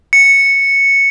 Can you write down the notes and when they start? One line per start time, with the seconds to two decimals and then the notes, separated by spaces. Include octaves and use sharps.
0.13 C#7